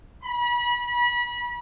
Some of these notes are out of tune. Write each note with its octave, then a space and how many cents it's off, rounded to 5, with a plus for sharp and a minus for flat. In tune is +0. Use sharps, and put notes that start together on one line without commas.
B5 -30